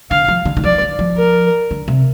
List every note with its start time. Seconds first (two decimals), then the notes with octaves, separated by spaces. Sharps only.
0.11 D3 F5
0.28 F3
0.45 D3
0.57 D3
0.64 F3 D5
0.81 D3
0.99 F3
1.17 A#4
1.71 D3
1.88 C3